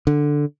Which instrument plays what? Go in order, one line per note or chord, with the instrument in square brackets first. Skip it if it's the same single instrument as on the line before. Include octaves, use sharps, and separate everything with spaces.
[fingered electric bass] D3